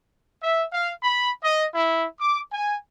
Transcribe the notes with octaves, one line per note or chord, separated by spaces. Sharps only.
E5
F5
B5
D#5
E4
D6
G#5